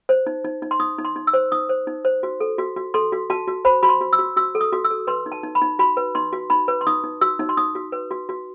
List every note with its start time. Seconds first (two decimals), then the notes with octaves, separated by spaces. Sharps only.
0.09 C5
0.27 D#4
0.44 D#4
0.62 D#4
0.71 C6
0.80 D#4 D#6
0.99 D#4
1.05 C6
1.16 D#4
1.27 E6
1.34 C5
1.52 D#4 D#6
1.69 C5
1.87 D#4
2.05 C5
2.23 F#4
2.40 A4
2.58 F#4
2.76 F#4
2.94 A4 C6
3.12 F#4
3.30 F#4 A5
3.47 F#4
3.65 C5 B5
3.83 F#4 B5
3.89 C6
4.01 F#4
4.13 E6
4.19 F#4
4.37 F#4 E6
4.55 A4
4.61 D#6
4.72 F#4
4.84 E6
4.90 A4
5.07 B4 C6
5.26 D#4
5.32 A5
5.43 D#4
5.55 B5
5.62 D#4
5.79 F#4 B5
5.97 B4
6.15 D#4 C6
6.33 F#4
6.50 D#4 B5
6.68 B4
6.81 C6
6.87 D#4 D#6
7.04 D#4
7.21 F#4 E6
7.39 D#4
7.49 C6
7.57 D#4 D#6
7.75 F#4
7.92 B4
8.11 F#4
8.29 F#4